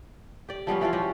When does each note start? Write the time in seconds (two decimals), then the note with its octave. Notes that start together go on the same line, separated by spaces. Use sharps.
0.49 G4 D5
0.67 F3 G3 B3 C#4
0.81 E3 F3 C4 F4
0.93 C#4 F#4 G4